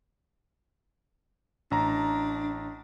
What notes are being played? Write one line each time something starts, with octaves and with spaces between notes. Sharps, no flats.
A1 D4 A#5